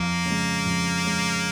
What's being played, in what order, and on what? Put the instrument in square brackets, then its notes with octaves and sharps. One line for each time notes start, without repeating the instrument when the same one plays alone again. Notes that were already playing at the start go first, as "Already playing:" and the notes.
Already playing: [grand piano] F2 [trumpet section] A#3
[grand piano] C#3 G#3
F2
C#3 G#3